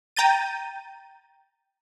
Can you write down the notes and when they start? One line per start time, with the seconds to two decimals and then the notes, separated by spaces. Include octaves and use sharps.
0.17 G5 A#5 G6 A6 D#7